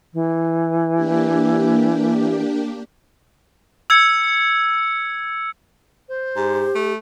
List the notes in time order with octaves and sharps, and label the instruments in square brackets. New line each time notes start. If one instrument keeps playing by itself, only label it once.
[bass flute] E3
[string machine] A#3 D4 G4
[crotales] E6 G#6 C#7
[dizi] C5
[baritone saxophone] G#2 [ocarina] G4
[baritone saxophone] A3